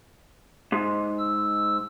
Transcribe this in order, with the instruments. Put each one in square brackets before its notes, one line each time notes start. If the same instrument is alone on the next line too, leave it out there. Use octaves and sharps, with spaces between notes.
[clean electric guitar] G#2
[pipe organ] E6